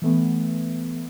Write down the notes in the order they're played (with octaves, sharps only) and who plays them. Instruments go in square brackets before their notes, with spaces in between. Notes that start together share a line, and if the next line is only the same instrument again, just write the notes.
[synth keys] E3 A3 B3